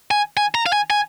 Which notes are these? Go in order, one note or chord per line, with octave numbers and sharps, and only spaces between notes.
G#5
G#5
A#5
F5
G#5
G#5